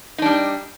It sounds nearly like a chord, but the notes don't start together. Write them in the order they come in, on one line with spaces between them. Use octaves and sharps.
D#4 D4 G3